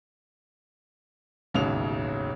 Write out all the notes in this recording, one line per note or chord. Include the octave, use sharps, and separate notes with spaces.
E1 A1 D#2 C#3 F7